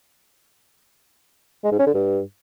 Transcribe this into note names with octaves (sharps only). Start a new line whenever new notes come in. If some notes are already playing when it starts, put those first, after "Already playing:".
G#3
G#2
C#4
D3
G2